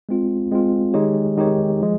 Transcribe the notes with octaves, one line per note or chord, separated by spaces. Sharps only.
G#3 C4 F4
G#3 C4 F4
D#3 G#3 D#4 G4 C#5
D#3 G#3 D#4 G4 C#5
F3 G#3